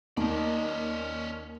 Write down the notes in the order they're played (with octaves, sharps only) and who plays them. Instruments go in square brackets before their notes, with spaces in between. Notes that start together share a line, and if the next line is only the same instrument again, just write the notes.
[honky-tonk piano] D#2 [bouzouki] D#3 D#4 D#5 [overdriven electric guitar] C#4 D5